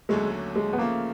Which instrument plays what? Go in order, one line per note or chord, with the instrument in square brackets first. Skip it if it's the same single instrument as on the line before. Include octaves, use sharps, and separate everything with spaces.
[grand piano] D#2 D3 F#3 A3 C#4 [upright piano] G#3
[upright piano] G#3
B3
[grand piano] C#3 F3 A3 [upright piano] A#3